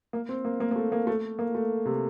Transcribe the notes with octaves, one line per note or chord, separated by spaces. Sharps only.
A#3
C4
A#3
A#3
A#3
A3
A#3
A3
A#3
A3
C3